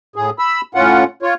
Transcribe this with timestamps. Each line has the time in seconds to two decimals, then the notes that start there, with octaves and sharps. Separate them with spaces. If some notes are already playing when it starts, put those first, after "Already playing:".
0.16 A2 G#4
0.39 B5 E6
0.75 A2 C#4 F4 F#5
1.23 F4 C#5